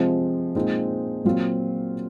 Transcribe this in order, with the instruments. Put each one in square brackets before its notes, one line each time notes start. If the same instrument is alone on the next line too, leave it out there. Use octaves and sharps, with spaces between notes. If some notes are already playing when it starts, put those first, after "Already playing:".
Already playing: [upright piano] C3 F3 G#3 C4
A#2 G#3 C4 D#4
A#2 F#3 C4 F4